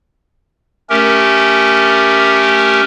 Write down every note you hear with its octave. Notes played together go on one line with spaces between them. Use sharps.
A3 C#4 G4 A#4